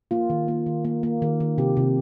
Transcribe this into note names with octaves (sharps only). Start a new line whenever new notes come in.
A#3 F4
D#3
A#3
D#3
A#3
A#3
D#3
D#3
C3 G4
C3